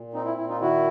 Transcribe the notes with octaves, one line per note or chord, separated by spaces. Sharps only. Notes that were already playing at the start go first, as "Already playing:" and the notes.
Already playing: A#2
C4 D#4
E4
A#2 E4
D#4 F4
D#3 E4 F#4